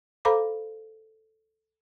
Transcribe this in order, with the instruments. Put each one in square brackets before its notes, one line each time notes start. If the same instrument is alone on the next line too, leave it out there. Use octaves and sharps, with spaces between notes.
[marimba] A4 C5 F5 A#5 B5 D6